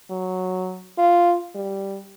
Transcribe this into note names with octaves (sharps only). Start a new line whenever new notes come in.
F#3
F4
G3